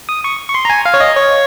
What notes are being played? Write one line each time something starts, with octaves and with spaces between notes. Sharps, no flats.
D#6
C#6
C#6
C6
A#5
G#5
F5
C#5
D#5
C#5